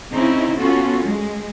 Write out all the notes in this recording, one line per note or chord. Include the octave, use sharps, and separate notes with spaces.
C#3 C4 C#4 D#4 E4
B3 C#4 F4 F#4 A4
G#3